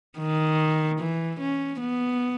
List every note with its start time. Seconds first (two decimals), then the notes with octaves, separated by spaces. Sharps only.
0.18 D#3
0.99 E3
1.40 C#4
1.80 B3